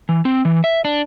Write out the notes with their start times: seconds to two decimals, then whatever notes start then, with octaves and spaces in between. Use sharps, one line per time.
0.09 E3
0.25 C4
0.45 E3
0.64 E5
0.85 D4